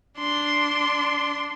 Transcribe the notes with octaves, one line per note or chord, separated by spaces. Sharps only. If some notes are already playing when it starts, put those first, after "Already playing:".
D4 C6